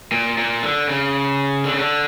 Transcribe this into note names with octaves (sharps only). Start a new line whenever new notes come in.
A#2
A#2
D3
C#3
D3
C#3
D3